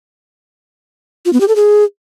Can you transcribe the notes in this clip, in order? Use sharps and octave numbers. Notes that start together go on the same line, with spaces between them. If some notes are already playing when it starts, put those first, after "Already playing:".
F4
B3
G4
A4
G#4